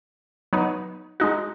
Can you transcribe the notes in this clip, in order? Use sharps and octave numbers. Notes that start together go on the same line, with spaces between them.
F#3 B3 D#4
G#3 D#4 F#4